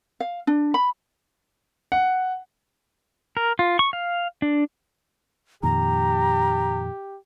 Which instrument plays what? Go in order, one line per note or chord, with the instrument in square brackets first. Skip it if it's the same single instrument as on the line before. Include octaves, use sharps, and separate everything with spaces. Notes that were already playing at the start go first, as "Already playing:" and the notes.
[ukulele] F5
D4
B5
[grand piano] F#5
[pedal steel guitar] A#4
F4
C#6
F5
D4
[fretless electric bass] F2 A#2 D#3 [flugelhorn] G4 [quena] A#5